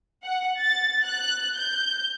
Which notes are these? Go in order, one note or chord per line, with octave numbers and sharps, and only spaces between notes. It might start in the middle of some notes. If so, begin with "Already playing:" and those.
F#5
A6
F#6
G6